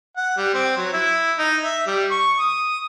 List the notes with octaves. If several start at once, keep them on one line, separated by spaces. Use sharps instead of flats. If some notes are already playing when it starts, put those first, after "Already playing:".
F#5
G3
C4
F#3
E4
D#4
E5
G3
C#6
D#6